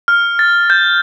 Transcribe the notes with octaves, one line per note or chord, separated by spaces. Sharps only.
F6
A6
G6